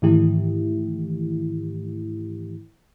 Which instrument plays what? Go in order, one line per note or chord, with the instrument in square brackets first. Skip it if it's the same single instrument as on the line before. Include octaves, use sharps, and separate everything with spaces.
[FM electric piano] G#2 D#3 E3 A3 E4 G4